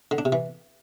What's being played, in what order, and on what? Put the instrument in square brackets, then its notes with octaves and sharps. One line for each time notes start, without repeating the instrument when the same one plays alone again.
[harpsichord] D3
D4
C3
E3